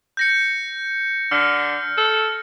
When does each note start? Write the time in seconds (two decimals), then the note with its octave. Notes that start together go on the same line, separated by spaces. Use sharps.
0.17 G6 A#6 C#7
1.31 D3 F6
1.98 A4